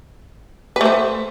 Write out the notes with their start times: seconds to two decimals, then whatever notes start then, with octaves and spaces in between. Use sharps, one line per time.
0.76 B4
0.81 A3
0.85 C5